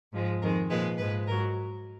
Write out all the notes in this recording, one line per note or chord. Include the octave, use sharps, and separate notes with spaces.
G#2 F3 G#3
F2 D#3 G#3 A#4
A#2 F3 G#3 B4
G#2 F3 G#3 B4
G#2 F#3 A#4